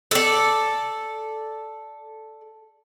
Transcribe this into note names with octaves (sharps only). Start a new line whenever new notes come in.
A4 D5